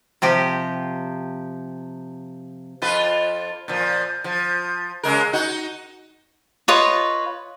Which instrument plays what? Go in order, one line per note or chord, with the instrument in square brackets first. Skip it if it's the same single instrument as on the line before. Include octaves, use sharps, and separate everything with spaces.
[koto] C3 F3 G4
[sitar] F2 F4 B4
A#2 F3
F3
C#3 G#3 A#4
D#4 F#4
[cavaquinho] F4 B4 C#5 D#5